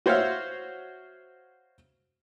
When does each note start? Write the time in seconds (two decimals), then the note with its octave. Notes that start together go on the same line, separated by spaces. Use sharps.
0.06 F#4 C5 C#5 E5 F5